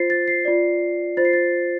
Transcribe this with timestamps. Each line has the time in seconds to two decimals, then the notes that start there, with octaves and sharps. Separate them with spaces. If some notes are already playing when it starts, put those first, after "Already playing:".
Already playing: F4 C5 A6 C7
0.10 A6
0.28 C7
0.45 F4 D5
1.17 F4 C5 A6
1.25 C7
1.33 A6